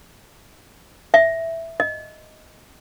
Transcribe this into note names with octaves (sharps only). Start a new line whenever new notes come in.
E5
D#5